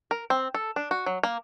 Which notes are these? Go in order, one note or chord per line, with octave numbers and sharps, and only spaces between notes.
A#4
C4
A4
D4
F#4
F#3
A#3